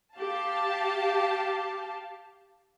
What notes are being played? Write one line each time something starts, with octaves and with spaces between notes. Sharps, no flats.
G4 F5 A5